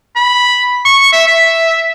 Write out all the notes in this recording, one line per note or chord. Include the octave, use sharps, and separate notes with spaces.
B5
C#6
E5
E5